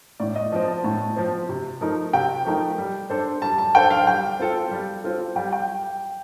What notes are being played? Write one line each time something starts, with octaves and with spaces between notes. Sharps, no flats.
A2 D5
D#5
F3 C4
A5
A2 A5
F3 C4
C3
F3 A3 D#4 A#4
C3 G5
F3 A3 D#4 A#4
G3
D4 A4 C5
G3 A5
A5
D4 A4 C5 G5
F5
G3 G5
C4 F4 A4
G3
C4 F4 A4
G3 G5
G5